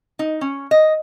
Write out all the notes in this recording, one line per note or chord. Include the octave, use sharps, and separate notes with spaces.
D#4
C#4
D#5